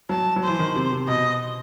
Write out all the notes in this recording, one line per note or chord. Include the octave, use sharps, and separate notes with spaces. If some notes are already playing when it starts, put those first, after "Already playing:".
F#3 A5
F#3
E3 C5
D#3
C3
C3
B2 D#5